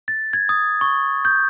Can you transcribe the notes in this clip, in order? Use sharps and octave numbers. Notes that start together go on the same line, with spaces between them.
A6
G#6
D#6
C#6
G6